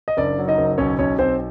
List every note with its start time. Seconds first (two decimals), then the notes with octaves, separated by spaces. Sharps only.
0.08 D#5
0.17 F#1 D4 D5
0.39 F#3
0.48 D#4 D#5
0.58 F#1
0.78 B1 C#4 C#5
0.99 B1 C#4 C#5
1.18 B1 C4 C5